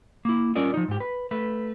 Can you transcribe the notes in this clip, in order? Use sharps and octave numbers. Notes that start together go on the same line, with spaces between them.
A#3 E4
G3 C#4 F4 A#4 D5 D#5
F3 D#4
G#2 G4
B4
A3 B4